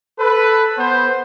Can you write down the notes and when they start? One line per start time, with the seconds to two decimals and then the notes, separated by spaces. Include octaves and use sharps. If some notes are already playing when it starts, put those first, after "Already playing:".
0.19 A4 B4
0.77 B3 C5